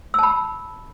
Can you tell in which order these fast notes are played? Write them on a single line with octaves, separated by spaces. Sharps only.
E6 A5 B5